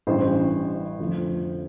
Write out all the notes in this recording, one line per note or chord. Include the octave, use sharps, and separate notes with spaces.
A1 G2 E3 G3 C5
F2 D3 F3 A3